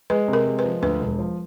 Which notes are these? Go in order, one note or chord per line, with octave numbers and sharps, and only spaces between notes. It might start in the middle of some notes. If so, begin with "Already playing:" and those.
G#3 B4
C3
A#4
G#3
F3 B4
D2 B4
E1
F3